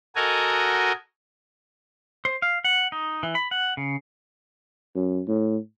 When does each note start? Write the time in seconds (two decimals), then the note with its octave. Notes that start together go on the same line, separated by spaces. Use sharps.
0.16 F#4 A4 A#4 D#5 G#5 A#5
2.25 C5
2.42 F5
2.64 F#5
2.92 D#4
3.23 E3
3.35 B5
3.51 F#5
3.77 C#3
4.95 F#2
5.28 A2